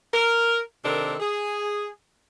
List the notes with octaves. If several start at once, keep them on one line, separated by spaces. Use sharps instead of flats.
A#4
C3 D#3 C4 D4 A4 A#4
G#4